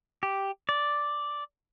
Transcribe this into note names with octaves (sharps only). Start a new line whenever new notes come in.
G4
D5